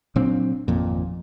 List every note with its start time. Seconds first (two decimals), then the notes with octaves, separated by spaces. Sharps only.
0.16 A#2 F#3 C4 D4
0.68 G#1 F2 A#2